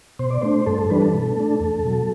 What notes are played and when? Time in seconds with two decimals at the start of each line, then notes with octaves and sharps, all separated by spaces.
0.19 B2 C5
0.30 D5
0.42 A3 D4 C5
0.66 G2 A4
0.78 A4
0.90 E3 G3 D4 B4
1.02 A4
1.14 B2
1.37 A3 D4
1.60 E2
1.84 B2 F#3